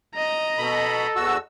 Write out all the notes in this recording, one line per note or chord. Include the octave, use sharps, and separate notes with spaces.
D#5 A#5
B2 A4 B5
E2 F#4 E6